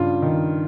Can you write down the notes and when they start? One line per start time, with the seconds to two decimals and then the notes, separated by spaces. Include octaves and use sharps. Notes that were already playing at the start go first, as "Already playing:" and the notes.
Already playing: G2 C#3 F4
0.22 D#3